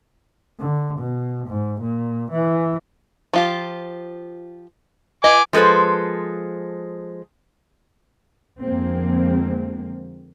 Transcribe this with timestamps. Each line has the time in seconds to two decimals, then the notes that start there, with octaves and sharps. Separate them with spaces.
0.59 D3
0.99 B2
1.47 G#2
1.81 A#2
2.31 E3
3.33 F3 F4 G4
5.24 D#5 G#5 D6
5.53 F3 G#3 A4 B4 C5
8.61 F2 D3 F3 G#3 A#3 C4